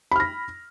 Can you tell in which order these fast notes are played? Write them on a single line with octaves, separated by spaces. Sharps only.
B5 F6 A#6